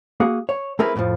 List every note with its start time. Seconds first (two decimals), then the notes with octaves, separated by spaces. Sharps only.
0.20 A#3 F#4 G#4
0.49 C#5
0.79 A3 C4 E4 G#4 A#4 B4
0.96 F2 A2 D3 F3